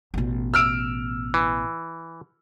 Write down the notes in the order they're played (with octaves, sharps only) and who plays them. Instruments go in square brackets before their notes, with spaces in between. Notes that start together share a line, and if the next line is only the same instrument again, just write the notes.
[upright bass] A1 B2
[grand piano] E6 F6 D7
[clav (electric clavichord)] E3